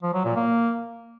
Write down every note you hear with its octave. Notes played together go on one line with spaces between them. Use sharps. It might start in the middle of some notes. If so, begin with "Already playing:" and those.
F3
F#3
A#2
A#3